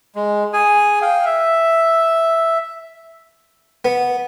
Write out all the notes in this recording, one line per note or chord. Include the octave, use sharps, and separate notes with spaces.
G#3
G#4 G#5
F5 G5
E5
B3